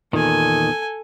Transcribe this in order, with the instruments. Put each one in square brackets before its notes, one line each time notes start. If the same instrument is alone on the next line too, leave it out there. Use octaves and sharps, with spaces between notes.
[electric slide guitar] E2 A#2 D#3 [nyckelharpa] A4 G#5